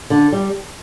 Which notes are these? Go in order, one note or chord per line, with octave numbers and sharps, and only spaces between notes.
D3
G3